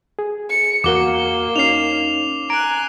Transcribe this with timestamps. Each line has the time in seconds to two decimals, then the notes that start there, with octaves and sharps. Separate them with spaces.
0.19 G#4
0.50 C#7
0.84 E2 A#3 F#4 A#4 D6 G7
1.56 C#4 D#4 C7 F7
2.50 G#5 A#5 F#6 D7